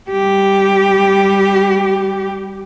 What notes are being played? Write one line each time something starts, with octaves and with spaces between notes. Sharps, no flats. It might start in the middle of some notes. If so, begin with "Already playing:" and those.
G3 G4